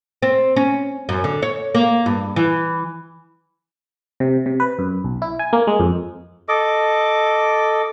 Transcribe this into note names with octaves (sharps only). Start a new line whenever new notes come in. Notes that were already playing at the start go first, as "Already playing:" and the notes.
C4
C#4
F#2
D3
C#5
A#3
G2
E3
C3
C3
B4
F#2
B1
E4
G#5
A#3
G#3
F2
A4 D#5 D6